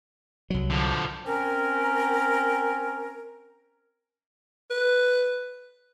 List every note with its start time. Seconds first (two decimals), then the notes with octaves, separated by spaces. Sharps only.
0.50 C2 F#3
0.71 D3 F3
1.25 C4 C#4 A#4
4.70 B4